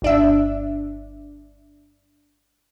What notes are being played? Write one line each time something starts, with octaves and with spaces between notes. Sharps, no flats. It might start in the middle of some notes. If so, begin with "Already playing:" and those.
G1 D4 E5